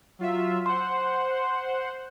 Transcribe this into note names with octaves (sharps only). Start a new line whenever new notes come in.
F#3 F4 E5
C5 F#5 C6